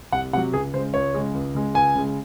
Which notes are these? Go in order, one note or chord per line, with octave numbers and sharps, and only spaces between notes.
C2 F#5
C3 F#3 F#5
C#2 G#4
C#3 G#3 C5
C#2 C#5
C#3 G#3
C#2
C#3 G#3
C#2 G#5
C#3 G#3